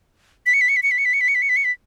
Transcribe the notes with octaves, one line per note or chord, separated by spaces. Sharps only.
B6
C#7
B6
C#7
B6
C#7
B6
C#7
B6
C#7
B6
C#7
B6
C#7
B6
C#7
B6